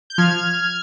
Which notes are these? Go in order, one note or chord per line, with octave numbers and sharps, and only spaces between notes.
G6
F3 F6 G#6